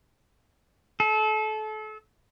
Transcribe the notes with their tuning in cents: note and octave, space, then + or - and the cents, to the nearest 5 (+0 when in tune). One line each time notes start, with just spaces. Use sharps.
A4 -30